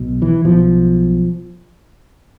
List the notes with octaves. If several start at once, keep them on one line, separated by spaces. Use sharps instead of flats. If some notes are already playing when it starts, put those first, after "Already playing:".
Already playing: B1 B2
E3
B1 B2 F3